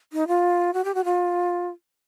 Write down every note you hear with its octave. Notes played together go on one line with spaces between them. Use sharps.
D#4
F4
F#4
G4
F#4
F4